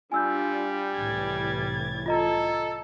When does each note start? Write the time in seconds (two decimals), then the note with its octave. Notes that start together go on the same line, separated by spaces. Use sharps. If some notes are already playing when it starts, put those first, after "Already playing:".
0.12 G3 D4 F4 G#5 E6 G6
0.94 C2 A2 E3 G#6 A6
2.06 F4 A4 D#5 A#5